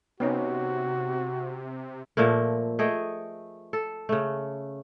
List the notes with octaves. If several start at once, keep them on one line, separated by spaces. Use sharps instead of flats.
C3 B3 C#4 D#4 F#4
A#2 F3 A3 A#3
A3 G#4 D#5 G5
A4
C#3 A3